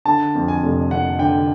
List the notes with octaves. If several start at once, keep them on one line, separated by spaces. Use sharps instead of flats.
D3 A5
F2
G#5
F1
F1 F#5
D3 G5